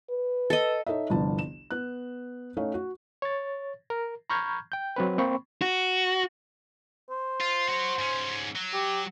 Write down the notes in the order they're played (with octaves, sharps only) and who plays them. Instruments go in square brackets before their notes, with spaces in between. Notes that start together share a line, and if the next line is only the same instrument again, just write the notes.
[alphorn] B4
[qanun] A4 D#5
[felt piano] D#4 A4 C#5 D#5 E5
G1 C2 D3 F3 B3 A5
E7
B3 F#6
A3 C#4 D#4 C#5 F5
F#4
[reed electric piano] C#5 A6
A#4
A#5 B5 C#6 F6 G6 G#6
G5 G6
F#3 C4 B4
A#3 C4 B5 C#6
[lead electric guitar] F#4
[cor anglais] C5
[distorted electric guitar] F4
F#4 C#5
G#2 C#4
F#3
[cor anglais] G4